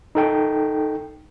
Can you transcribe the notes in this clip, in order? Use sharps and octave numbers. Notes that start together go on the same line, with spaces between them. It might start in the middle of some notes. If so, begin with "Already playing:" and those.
D#4 A4 G5